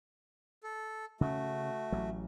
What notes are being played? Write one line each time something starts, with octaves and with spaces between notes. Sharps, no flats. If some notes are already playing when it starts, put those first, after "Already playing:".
A4
C#3 A3 C#4 F#4
A1 F#3